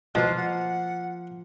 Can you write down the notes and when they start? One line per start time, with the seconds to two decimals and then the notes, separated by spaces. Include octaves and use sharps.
0.15 B2 F3 A#3 F4 F#6
0.37 F#5